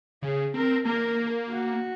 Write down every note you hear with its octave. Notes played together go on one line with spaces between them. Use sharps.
C#3 G#4
C4 A#4
A#3 A#4
F#4